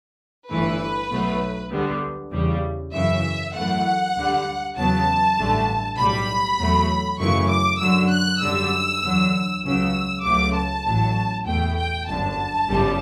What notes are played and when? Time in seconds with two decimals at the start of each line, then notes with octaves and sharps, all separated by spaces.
0.49 G1 G2 E3 A3 B4
1.10 B1 B2 F#3 A3
1.71 D2 D3 G3 B3
2.32 E2 C#3 G3
2.93 F#2 C#3 E3 E5
3.53 F#2 E3 A3 F#5
4.14 D2 D3 G3
4.75 E2 C#3 F#3 B3 A5
5.36 A1 G2 D3 A3
5.97 B1 A2 G3 B5
6.58 E2 B2 F#3 A3
7.19 F#2 C#3 E3 A3 C#6
7.50 D6
7.80 F#2 D3 F#3 E6
8.11 F#6
8.41 F#2 D3 G3 E6
9.02 E2 D3 F#3
9.63 C#2 C#3 F#3 E6
10.24 C#2 C#3 F#3 A3 D6
10.54 A5
10.85 A1 A2 F#3
11.45 E2 B2 A3 G5
11.76 G5
12.07 G1 F#2 D3 A5
12.68 G1 F#2 C#3 G3